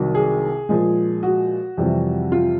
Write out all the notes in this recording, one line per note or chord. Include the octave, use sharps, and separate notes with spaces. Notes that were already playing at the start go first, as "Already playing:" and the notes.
Already playing: C2 C3 D#3 F#3
G#4
A#2 F3 G#3
F#4
F2 C3 E3 G3
F4